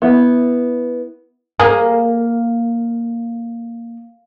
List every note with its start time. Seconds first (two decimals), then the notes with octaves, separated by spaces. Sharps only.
0.02 B3 E4
1.60 A#3 G#4 A#4